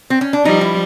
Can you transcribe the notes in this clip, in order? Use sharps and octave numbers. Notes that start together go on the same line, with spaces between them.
C4
C#4
D4
F3 G3 D#4
E4